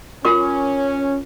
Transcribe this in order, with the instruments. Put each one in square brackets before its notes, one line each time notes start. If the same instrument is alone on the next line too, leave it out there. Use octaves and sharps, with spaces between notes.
[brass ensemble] C#4 [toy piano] F4 A#4 D6